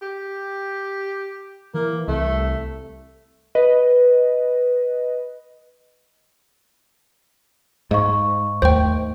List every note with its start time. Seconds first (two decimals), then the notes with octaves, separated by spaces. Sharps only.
0.02 G4
1.74 E3 A#3
2.08 C2 A3
3.55 B4 D#5
7.91 G#2 D#5 F5 C#6
8.62 D#2 A3 C5 G5